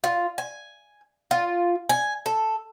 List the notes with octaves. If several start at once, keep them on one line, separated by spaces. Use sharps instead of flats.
F4
G#5
F4
G#5
A4